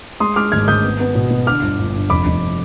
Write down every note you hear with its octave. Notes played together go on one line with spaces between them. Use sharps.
G#3 C6 D#6
G#3 D6 F6
G#1 F6 G#6
G#1 D#6 G6
B3
B3
B2
B2
D3 D6 F6
G1
G1
G2
F1 B5 D6
F1